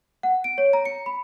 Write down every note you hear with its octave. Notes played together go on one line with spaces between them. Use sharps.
F#5
D7
C#5
A#5
C#7
B5